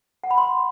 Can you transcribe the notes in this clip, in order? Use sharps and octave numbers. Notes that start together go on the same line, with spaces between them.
F#5
B5
C6